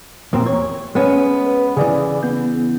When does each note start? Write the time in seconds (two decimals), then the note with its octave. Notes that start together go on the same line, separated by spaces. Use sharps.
0.33 E2 A#2 C4
0.46 C#5
0.95 G#3 B3 C#4
1.47 B4
1.77 C#3 E3 G#4 D5
2.23 B3 G6